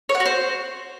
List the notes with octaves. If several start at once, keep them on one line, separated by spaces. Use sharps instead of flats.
C#5
F#5
F#4
C5